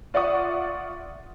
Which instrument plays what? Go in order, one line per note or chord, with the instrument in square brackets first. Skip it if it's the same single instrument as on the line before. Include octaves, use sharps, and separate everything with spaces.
[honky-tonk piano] F4 D5 E5 F#5 C#6 D#6